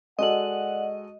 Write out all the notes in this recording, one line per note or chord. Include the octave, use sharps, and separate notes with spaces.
G#3 F#4 A4 D5 D#5 F#5 F#7